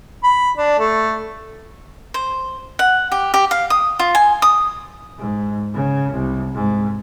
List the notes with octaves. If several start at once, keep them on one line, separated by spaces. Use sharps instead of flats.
B5
D4
A3
C5
F#5
G4
G4
F5
D#6
F4
G#5
D#6
G#2
C#3
C2
G#2